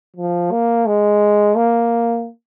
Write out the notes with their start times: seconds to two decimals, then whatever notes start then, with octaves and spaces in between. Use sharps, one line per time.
0.16 F3
0.51 A#3
0.87 G#3
1.56 A#3